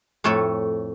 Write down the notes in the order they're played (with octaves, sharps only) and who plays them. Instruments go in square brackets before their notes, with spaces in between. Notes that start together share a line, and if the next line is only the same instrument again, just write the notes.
[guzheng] F2 A2 A3 A4 C#5